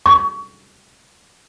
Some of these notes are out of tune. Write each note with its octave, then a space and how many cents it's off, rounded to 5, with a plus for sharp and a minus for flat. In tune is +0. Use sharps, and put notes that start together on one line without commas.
C#6 +30